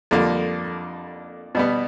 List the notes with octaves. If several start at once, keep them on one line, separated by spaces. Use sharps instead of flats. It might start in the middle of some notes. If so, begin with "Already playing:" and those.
F2 D3 G3 A#3
B2 G3 B3